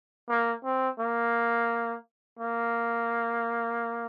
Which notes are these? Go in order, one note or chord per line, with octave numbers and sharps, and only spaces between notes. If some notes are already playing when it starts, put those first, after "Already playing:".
A#3
C4
A#3
A#3